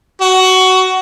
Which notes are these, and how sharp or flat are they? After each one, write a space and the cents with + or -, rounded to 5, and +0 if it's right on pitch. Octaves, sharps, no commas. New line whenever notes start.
F#4 +15